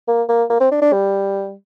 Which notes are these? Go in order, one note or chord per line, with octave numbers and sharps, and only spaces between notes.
A#3
A#3
A#3
C4
D4
D4
G3